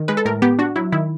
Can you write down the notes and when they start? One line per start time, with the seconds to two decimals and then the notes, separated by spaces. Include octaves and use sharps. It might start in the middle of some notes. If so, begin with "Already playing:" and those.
Already playing: D#3
0.08 G#3 B4
0.17 A4
0.25 A2 A#4
0.42 B3 G4
0.59 D4 F#4
0.76 F#3 E4
0.92 D#3 E4